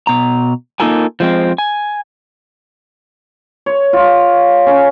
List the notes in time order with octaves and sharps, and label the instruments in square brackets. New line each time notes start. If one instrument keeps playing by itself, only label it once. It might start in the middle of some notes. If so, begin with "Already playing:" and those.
[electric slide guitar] B2 A#5
A#3 D#4 F4 A4 A#4 G#5
F3 G#3 C4
G#5
[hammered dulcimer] C#5
F4
C#4